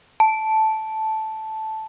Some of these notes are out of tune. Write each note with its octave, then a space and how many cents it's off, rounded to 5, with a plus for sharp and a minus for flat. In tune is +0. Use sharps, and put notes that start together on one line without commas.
A5 -5